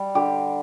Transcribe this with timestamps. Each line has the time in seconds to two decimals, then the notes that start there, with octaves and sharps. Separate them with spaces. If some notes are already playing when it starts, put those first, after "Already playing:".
Already playing: G3
0.15 D3 G4